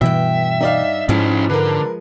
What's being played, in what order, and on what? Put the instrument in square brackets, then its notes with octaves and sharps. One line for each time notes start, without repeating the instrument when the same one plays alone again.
[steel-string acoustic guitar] G2 G5 [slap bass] B2 E3 [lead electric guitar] E5 [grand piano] E6
[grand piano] D#4 D5 F5
[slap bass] G#2 [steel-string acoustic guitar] F3 G#3 [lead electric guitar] C#4 E4
[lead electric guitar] D3 [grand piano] A#4 B4